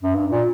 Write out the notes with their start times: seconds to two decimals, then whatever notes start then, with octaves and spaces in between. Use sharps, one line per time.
0.03 F#2
0.14 G2
0.31 A#2